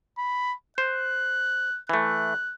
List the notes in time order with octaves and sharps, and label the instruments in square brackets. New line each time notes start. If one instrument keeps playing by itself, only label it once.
[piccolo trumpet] B5
[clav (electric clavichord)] C5 [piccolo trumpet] F#6
[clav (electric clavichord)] E3 A3 [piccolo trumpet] F#6